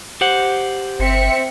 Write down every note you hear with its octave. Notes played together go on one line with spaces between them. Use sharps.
G4 C5 F#5
G1 C4 E5 C#7